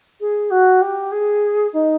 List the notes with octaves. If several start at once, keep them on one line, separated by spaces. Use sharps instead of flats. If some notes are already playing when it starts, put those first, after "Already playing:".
G#4
F#4
G4
G#4
D#4